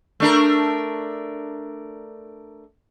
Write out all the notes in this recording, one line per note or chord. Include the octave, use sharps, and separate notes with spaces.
A3 D4 A#4